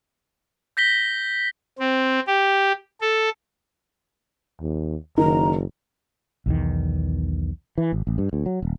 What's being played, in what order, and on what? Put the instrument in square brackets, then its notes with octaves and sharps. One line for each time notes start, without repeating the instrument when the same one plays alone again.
[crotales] G6 A#6 B6 G7
[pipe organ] C4
G4
A4
[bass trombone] D#2
[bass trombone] F#1 [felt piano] D#3 [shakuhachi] A#5
[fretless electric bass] B1 E2 D#3
E3
G#1
A1
G2
D2
F#3
D#1